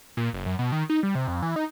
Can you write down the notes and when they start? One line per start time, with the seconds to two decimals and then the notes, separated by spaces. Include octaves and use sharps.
0.17 A#2
0.33 F#1
0.46 F#2
0.59 B2
0.72 D#3
0.90 D#4
1.03 G3
1.15 C3
1.28 F2
1.42 E3
1.56 D#4